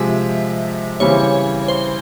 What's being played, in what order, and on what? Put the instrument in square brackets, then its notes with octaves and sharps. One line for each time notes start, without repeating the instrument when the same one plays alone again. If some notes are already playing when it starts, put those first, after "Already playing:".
Already playing: [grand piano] C3 F3 G#3 [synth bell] E5
[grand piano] C#3 E3 G3 C4 [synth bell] C#5
[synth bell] C5